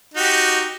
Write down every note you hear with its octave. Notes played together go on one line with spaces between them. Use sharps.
D#4 F#4 G4